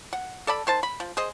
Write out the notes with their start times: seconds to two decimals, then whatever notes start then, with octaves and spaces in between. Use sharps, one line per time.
0.13 F#5
0.47 A4 D5 A5 B5
0.67 D#3 C5 A5
0.83 B5
1.00 F3
1.17 G#4 C5 D#5